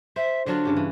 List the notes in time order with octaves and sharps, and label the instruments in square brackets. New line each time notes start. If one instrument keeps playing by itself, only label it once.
[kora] C5 [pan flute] E5
[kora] D3 F#3 F4 [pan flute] D4
[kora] G2 C#3 G4
E3